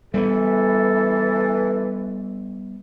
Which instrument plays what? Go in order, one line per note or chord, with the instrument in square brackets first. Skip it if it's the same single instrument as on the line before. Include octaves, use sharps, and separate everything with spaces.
[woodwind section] E3 [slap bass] G3 G#3 B3 [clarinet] A4